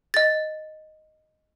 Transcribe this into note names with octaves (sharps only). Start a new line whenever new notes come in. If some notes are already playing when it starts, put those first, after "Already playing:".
D#5 A6